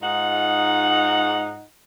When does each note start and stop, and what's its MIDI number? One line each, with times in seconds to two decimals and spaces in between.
0.01 1.63 44
0.01 1.63 63
0.01 1.63 65
0.01 1.63 78